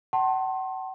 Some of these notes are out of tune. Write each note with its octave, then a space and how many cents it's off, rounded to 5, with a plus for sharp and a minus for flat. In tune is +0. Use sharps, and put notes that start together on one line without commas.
F#5 +40 A5 +5 C6 +30